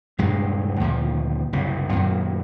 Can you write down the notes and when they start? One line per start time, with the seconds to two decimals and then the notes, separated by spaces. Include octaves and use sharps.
0.18 D#1 G2 C3 G#3
0.80 D2 A#2 D#3 F3
1.53 F#1 C2 C3
1.92 F#2 A#2 D#3 F#3